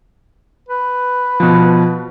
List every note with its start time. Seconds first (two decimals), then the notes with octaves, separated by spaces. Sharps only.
0.69 B4
1.40 B2 F3